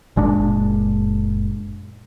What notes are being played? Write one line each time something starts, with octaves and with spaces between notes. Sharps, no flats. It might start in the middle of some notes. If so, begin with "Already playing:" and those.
F#1 A#2 G#3 D4